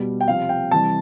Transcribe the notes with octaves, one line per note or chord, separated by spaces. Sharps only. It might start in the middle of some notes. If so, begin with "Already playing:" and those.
Already playing: B2 G3
G5
C3 F3 F5
G5
C3 E3 G3 A5